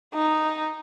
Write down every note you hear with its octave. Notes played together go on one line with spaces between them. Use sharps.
D#4